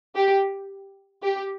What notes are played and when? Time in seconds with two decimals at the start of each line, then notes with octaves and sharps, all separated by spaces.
0.16 G4
1.23 G4